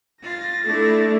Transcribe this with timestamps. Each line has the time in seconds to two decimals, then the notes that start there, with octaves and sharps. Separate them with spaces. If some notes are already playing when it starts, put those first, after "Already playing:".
0.23 F4 A6 A#6
0.67 A3 D4 E4